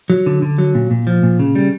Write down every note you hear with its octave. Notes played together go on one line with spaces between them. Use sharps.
F#3
D3
D3
F#3
A#2
A#2
F3
A#2
C#3
G3